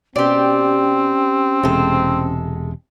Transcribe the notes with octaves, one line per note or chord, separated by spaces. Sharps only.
B2 C4 C#4 G4 D5
E1 C3 G#3 A4